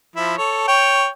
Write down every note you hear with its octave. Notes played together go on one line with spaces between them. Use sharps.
F3 E4
A4 C#5
C#5 G5